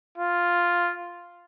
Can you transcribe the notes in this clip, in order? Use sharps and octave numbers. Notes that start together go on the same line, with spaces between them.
F4